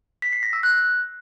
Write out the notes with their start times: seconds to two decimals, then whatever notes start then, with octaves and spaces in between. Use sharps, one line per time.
0.22 B6
0.33 C7
0.43 A#6
0.53 E6
0.63 F#6